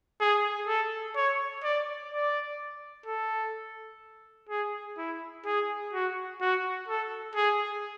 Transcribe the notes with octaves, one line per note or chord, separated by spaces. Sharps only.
G#4
A4
C#5
D5
D5
A4
G#4
E4
G#4
F#4
F#4
A4
G#4